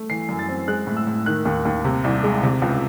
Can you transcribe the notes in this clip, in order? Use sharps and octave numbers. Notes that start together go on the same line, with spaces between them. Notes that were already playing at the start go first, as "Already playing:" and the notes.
Already playing: A3
E3 C7
F#2
A6
C4
G#3 F#6
A2
E6
A2
D#3 F#6
D#2
D#2
C3
C2
G#3
C3
C#2